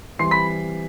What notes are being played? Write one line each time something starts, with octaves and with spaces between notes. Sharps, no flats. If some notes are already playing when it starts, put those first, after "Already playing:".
E3 G3 C4 C6 C7
B5 B6